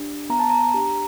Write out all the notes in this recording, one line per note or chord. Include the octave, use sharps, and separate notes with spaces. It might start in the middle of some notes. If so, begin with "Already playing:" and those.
Already playing: D4 G4
B3 A#5
A5
A#5
D4 G4